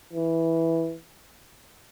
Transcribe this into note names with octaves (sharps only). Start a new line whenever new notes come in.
E3